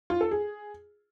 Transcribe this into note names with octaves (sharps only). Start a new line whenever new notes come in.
F4
A4
G#4